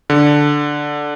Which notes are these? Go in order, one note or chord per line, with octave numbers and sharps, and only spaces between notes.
D3